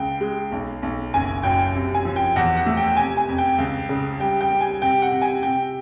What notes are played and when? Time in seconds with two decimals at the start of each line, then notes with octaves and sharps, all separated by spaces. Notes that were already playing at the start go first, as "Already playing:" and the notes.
Already playing: C#2 G5
0.21 G#3
0.52 B1
0.82 B1
1.14 F#1 G#5
1.43 F#2 G5
1.75 C3
1.95 G#5
2.05 F3
2.16 G5
2.36 E2 F#5
2.56 F#5
2.66 A3
2.77 G5
2.97 C3 G#5
3.17 G#5
3.29 F2
3.38 G5
3.58 C#2
3.89 C#3
4.20 G3 G5
4.41 G5
4.51 G3
4.61 G#5
4.82 C3 G5
5.02 F#5
5.11 C3
5.22 G#5
5.43 C3 G5